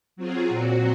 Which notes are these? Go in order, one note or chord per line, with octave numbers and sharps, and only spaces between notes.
F#3 C4 F4 G#4
A#2 F#3 C4 F#4